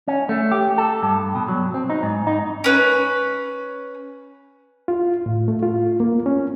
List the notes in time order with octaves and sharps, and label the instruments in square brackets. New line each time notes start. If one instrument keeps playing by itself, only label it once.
[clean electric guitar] C#4
A3
G4
A4
G2
B2
F#3
C4
D#4
G#2
D#4
[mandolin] C#4 B4
[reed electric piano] F4
A2
A3
F4
A#3
C#4